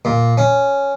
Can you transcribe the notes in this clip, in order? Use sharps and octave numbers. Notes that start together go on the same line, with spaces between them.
A#2
C#4